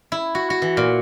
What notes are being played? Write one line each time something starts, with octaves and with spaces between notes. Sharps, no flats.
E4
F#4
F#4
E3
A#2